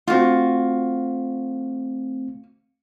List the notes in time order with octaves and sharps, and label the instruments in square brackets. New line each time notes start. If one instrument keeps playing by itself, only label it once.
[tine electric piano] A3 C4 [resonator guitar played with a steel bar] F4 F#4